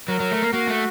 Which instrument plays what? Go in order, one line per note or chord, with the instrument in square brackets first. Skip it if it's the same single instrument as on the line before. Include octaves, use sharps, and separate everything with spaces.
[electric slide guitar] F#3 [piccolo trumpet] A#4
[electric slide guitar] F#3
A3
A#3
[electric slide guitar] A#3 [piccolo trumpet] F#4
[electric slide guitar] A3